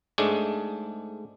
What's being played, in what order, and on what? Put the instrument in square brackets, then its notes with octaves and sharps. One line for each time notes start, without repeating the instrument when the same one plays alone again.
[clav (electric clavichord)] G#2 G#3 A3 D4